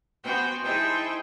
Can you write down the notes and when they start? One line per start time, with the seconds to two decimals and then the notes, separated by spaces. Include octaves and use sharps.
0.23 B3 F#4 C5 G5 G#5
0.62 D#4 E4 G#4 C5 G5 A5